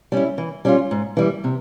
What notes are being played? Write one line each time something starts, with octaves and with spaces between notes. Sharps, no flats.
G3 C#4 E4
E3
G3 C#4 F4
G#2
E3 G3
C3